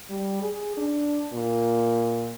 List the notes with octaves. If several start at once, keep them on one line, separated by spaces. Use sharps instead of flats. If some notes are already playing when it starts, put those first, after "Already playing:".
G3
G#4
D4
A#2